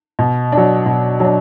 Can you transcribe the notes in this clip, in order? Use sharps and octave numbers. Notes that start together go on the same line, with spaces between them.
B2
D4
F#3
B2
F#3 D4